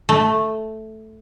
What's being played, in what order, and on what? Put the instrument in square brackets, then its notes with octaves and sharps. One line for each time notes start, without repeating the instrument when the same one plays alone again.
[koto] A3